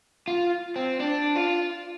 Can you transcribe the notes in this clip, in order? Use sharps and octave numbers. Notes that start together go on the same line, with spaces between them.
F4
C4
D4
F4